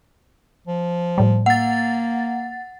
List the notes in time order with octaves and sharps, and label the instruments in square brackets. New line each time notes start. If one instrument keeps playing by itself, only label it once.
[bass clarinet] F3
[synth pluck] A2 G3
[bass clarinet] A#3 [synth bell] F#5 A6